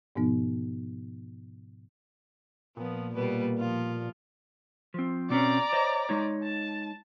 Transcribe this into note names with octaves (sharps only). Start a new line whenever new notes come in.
G#2 B2 F3 B3 D#4
A#2 F3 B3
B2 G3 A#3 B4
F3 F4
F3 C4
B2 C4 C#4 D5 A#5
C5 C#5 D#5
G#3 D#4 C#5
A5